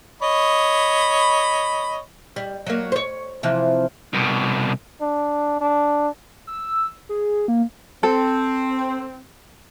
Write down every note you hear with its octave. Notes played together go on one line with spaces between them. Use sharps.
C#5 D#5 B5
G3
F#3 A#3
C5 C#5
C3 E3 F3
C2 B2
D4
D4
E6
G#4
A#3
C4 A4